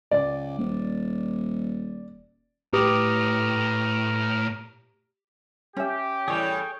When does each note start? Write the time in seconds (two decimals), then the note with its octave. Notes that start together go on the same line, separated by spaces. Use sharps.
0.11 C#2 D5
0.58 D#1
2.73 A2 G4 B4 A#5 D6 D#6 F6
5.77 C#4 G4 E5
6.28 A2 E3 G3 G#4 C#5 G5